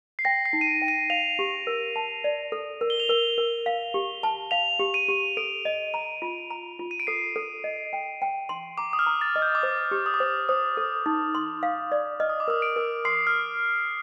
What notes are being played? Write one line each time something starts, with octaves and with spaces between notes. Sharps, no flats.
C7
G5 A#6
C7
D#4
D#7
D7
G5
D#7
F5 F7
G4
A#4
A5
D5
A4
A#4
G7
F7
A#4 G7
A#4
F5
G4
A5
F5 F7
G4
D#7
G4
A4 D7
D#5
A#5
F4
A#5
F4
D#7
D7
A4 C7
A4
D#5
G5
G5
C6
A#5 D6
D#6
F6
A#5
A6
D#5
G6
D6
C5 D#6
G4
D#6
D6
C5 D#6
C5 D#6
A4
D#4
C6
F5
D5
D#5 F6
D#6
D6
A#4 D#6
D7
A#4
C6 C7
F6